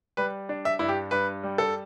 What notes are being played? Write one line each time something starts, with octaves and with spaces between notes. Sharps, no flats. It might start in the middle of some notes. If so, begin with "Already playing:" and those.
G3 B4
D4
E5
G2 E4
G4
G2 B4
G3
A4